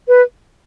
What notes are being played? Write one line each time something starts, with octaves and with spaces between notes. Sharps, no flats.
B4